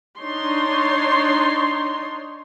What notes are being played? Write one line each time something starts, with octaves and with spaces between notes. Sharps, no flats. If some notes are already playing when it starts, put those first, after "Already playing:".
D4 D#4 C#5 C6